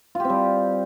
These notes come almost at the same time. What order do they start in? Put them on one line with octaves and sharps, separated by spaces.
F4 G4 C4 G3